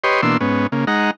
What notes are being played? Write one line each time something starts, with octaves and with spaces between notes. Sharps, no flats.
G4 B4 C#5 D#5 C6
B2 E3 A#3 D4 C6 E6
G#2 B3 C#4
C#3 A#3
G#3 D#4 F#5 A#5